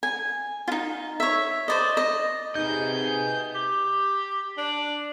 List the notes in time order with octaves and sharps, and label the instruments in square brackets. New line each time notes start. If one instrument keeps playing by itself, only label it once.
[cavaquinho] G#5
D#4 F4
C#5 E5
C5 D5 D#5
D#5
[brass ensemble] C3 G#4 [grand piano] D#4 [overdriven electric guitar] B4 D#5 [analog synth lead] G6
[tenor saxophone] G4
D4